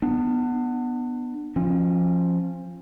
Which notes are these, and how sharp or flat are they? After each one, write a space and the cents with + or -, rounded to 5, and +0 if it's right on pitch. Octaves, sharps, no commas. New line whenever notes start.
B3 +0 D4 +30
F3 +0 C#4 -30